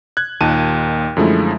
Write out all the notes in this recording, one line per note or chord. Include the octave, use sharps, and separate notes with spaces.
F#6 G#6
D#2 A#2 D#4 A5 D#7
F#2 D3 F3 G#3 A3 E4